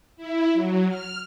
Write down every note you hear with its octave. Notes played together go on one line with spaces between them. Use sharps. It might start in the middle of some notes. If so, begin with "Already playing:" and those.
E4
F#3
F6